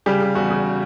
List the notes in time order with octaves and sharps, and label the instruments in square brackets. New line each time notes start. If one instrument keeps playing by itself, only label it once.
[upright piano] C#3 G3 G4
C#3
E2 F#4
C#3